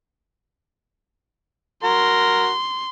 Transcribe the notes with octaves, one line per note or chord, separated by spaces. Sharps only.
F#4 A#4 C6